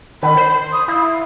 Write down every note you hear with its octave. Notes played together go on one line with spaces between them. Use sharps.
D#3 B5
C5
D#6
E4 F5